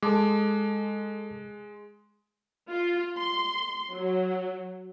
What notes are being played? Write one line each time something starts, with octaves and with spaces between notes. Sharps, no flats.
G#3 A4 A5 D6
F4
C6
F#3